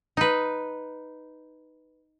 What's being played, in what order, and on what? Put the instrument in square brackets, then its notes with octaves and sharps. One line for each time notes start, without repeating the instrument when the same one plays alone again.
[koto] D#4 B4